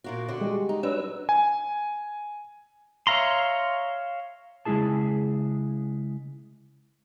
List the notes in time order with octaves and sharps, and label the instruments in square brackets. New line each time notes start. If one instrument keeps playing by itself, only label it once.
[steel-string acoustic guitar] A#2 A#3 F#4
D3 F#4
[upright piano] G3 G#3
[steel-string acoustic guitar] D#4
[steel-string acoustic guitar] F#3 [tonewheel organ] D4 B4 E6
[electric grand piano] G#5
[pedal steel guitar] C#5 E5 F5 A#5 C6
[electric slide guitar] C#3 G#3 A#3 E4 G#4 A5